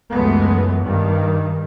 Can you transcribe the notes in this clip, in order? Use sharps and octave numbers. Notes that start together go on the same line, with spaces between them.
C#2 F#2 E3 G#3 A3 B3
G2 D#3